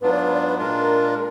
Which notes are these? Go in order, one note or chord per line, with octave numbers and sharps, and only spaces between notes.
G#2 F#3 B3 D4 F4 B4
D5
B4
D5
B4
A#2 G#3 D4 F4 A#4